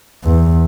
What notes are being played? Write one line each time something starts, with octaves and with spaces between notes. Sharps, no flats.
E2